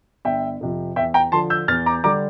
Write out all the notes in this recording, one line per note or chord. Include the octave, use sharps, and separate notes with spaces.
G1 E5 G5
F2 C3 F3
E2 E5 G5
G5 A#5
D3 F3 A5 C6
E6 G6
E2 F6 A6
A#5 D6
D3 G3 A#5 D6